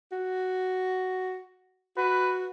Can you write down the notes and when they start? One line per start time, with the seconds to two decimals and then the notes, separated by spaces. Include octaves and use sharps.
0.12 F#4
1.97 F#4 B4